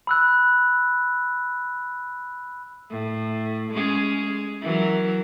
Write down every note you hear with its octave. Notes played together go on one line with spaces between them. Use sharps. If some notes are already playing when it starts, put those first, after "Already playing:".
B5 E6 F#6
A2
G#3 C#4 G#4
E3 F#3 A#4